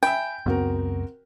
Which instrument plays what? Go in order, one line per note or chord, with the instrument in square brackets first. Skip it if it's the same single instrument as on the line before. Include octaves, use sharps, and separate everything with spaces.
[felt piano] E5 G#5 B5 [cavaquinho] G5
[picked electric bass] C#2 F#2 B3 [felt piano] C4 F#4 A#4